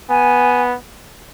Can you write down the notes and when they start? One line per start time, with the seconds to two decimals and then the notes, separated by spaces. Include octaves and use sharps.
0.10 B3 G#5